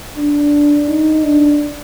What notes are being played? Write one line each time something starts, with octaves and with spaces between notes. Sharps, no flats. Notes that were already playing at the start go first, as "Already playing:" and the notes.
D4
D#4
D4